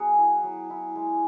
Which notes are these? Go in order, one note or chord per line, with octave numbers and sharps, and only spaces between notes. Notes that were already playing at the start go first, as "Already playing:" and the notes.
Already playing: F#3 B3 F#4 G#4 G#5
E4
F#3
E4
G#3